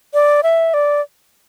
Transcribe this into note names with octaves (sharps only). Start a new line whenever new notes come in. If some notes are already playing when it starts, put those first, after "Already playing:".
D5
E5
D5